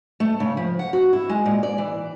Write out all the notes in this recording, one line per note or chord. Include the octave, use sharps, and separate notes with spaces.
A3
C#3
F3
F#5
F#4
E4
G#3
A#2
D5
E3